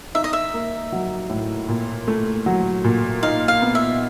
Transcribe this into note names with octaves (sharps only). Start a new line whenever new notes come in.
D#4 E5
D#5
E5
A#3
F#3
A2
A#2
A3
F#3
A#2
D#4 F5
F5
B3
E5